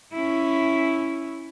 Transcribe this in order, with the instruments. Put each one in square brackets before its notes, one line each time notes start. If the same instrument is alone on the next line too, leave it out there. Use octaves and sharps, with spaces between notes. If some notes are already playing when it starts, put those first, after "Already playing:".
[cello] C#4 E4